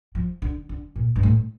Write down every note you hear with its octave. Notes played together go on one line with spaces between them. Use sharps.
F3
D3
D3
A#2
G2
A2